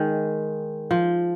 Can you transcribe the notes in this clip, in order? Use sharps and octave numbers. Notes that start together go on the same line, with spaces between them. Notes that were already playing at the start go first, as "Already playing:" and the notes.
Already playing: D#3 G#3
F3